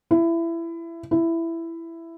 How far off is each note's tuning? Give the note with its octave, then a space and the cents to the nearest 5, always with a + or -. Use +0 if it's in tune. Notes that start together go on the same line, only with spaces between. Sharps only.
E4 +20
E4 +10